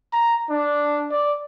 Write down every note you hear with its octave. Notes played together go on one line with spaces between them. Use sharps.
A#5
D4
D5